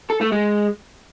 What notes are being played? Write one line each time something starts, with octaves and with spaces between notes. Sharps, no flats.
A4
A3
G#3